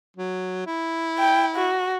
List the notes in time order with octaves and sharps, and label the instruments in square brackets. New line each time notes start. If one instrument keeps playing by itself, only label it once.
[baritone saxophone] F#3
E4
[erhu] G5
F#4